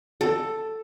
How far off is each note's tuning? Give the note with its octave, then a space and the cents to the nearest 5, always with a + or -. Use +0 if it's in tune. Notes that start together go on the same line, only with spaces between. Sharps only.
A4 +5